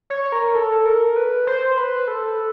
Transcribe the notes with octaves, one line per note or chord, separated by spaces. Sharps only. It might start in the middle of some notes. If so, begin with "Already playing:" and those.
C#5
A#4
A4
A#4
B4
C5
B4
A4